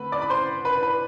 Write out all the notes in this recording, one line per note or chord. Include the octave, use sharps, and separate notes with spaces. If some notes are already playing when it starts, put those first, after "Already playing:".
Already playing: D3 A3 C4 B4 B5
D5 D6
B5
C5 C6
B4 B5
B4 B5